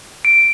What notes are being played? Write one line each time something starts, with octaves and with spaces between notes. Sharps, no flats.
D7